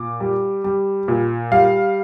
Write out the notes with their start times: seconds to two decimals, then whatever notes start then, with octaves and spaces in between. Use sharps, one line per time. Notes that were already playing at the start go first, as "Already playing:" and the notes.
Already playing: A#2 D6
0.20 G3
0.64 G3
1.08 A#2
1.52 G3 F5